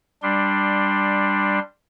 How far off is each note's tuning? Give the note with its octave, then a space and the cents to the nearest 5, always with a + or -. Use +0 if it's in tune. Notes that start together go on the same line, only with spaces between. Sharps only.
G3 +10 D4 +5 C6 +0